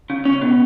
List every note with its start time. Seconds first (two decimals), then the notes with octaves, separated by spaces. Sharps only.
0.10 C#3
0.25 C#4
0.41 B2